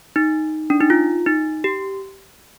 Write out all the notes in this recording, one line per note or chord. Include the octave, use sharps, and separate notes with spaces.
D#4
D4
D#4
F4
D#4
G4